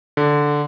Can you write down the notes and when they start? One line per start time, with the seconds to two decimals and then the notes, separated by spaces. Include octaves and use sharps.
0.17 D3